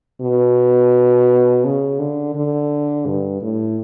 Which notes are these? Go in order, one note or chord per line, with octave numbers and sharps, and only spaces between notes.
B2
C#3
D3
D3
G2
A2